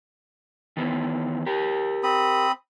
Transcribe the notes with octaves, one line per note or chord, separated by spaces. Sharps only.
D#3 E3 B3
G4 A#4
C4 B5 D#6